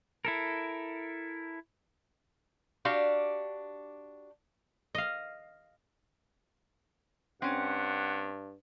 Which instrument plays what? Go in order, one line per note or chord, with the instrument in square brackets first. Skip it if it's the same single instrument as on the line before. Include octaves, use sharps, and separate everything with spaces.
[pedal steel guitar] E4 A4 A#4
[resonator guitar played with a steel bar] D4 F#4 G4 F5
[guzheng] D#5 F5
[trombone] G2 [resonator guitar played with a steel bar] C4 C#4 [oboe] F#5